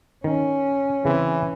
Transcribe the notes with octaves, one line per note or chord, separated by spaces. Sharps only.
D#3 C#4
C#3 E3 C4